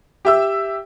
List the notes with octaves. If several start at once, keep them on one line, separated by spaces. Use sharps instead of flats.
G4 E5 E6